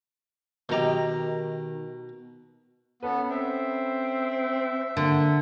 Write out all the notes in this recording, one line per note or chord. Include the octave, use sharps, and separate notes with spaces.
B2 D#3 D#4 G4 A#5
B3 C#4 A4 B4
C4 E5
D3 A#3 F#5